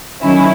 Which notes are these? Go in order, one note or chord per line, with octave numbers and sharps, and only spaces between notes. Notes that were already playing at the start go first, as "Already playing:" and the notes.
D#3 F#3 C#4 E4